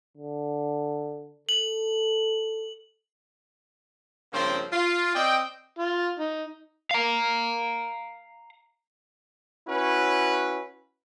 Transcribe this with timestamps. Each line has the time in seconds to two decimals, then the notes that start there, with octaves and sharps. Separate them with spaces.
0.17 D3
1.49 A4 F#7
4.33 G2 C#3 F3 A#3 C4 C5
4.72 F4
5.15 C4 D5 D#5 G5
5.79 F4
6.20 D#4
6.91 F5 A#5
9.68 C#4 E4 F#4 B4